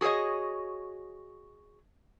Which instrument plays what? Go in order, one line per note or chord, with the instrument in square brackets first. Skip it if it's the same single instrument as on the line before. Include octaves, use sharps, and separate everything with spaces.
[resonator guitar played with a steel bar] F#4 G#4 A#4 C#5 D#5